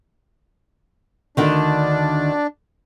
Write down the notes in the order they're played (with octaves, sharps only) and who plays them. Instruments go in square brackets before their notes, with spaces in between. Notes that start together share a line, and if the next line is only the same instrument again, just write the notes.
[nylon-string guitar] D2 D3 D#3 [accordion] D4